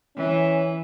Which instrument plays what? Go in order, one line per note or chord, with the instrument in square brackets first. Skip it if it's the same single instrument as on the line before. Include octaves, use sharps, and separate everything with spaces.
[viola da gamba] E3 [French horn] C#4